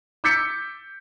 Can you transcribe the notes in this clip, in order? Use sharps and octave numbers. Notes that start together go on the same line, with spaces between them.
D6 E6 G6 A6 B6 C#7